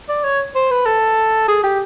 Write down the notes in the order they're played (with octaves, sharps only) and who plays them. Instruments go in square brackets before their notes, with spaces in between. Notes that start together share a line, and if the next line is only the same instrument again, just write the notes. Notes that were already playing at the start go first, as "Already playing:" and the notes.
[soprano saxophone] D5
C#5
C5
B4
A4
G#4
G4